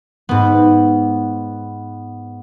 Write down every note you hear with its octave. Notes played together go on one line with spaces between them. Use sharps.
G#2 B3